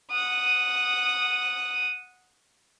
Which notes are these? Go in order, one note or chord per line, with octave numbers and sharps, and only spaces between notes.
F#5 D#6